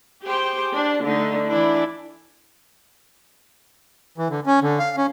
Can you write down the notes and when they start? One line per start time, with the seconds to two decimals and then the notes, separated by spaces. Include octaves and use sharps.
0.23 G4 G#4 C5 G5
0.73 D4
1.05 D3 A3 D#4
1.47 E3 D4 E4
4.18 E3
4.30 D3
4.46 C#4
4.62 D3
4.79 F5
4.97 C#4